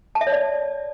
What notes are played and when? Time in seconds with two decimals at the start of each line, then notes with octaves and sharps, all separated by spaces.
0.15 A5
0.21 E5
0.27 C#5
0.32 D5